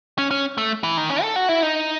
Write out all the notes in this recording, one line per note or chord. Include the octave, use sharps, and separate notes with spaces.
C#4
C#4
A3
E3
D#3
C#4
A4
F#4
E4
D#4